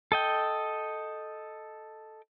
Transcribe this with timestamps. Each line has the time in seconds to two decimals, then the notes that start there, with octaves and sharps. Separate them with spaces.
0.12 A4 D#5 G5